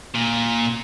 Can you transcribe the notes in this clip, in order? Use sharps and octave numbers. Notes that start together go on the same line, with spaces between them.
A#2